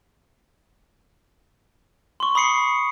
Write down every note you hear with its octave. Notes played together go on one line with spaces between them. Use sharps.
C6 C#6
B5 D#6 C7 C#7